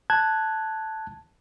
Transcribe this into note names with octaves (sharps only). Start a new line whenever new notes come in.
A5 F#6 G#6